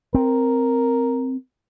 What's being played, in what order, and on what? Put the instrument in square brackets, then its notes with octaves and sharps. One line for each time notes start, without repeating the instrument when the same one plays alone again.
[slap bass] C4 [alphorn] A#4